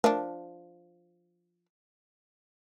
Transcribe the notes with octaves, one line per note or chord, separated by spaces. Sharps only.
F3 A3 D4 A#4